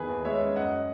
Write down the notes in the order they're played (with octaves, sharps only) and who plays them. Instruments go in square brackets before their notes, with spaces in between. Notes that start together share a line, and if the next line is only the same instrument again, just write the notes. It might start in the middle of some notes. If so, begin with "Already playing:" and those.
Already playing: [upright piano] E2 D#3 G#4 B4
D#2
G#3 C#5 E5
C#4
F#2 D#5 F#5